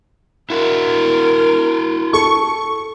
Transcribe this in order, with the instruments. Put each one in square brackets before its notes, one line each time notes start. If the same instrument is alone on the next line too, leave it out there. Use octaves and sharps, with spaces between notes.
[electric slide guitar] E4 F#4 [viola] A#4
[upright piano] A4 [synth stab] C#6